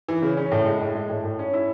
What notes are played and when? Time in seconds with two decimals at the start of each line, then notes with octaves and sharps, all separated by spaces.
0.08 E3
0.22 C#3
0.37 C#4
0.52 A2
0.66 G#3
0.81 A2
0.95 G#3
1.09 A2
1.24 A2
1.39 C#4
1.54 E4